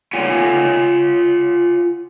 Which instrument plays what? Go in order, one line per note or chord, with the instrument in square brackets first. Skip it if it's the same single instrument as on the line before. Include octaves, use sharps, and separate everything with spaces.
[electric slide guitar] F4 C#5 F#5 G#5